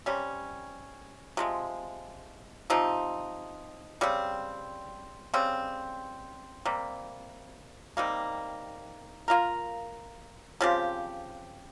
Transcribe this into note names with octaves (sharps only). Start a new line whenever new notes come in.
C3 G3 C#4
C3 F3 G#3
C3 F3 C4 D#4
C#3 G3 C4
C#3 G3 C4
C3 G3 A#3
C3 D#3 G3 A#3
A#3 F4 A#4
C#3 F3 C4 G4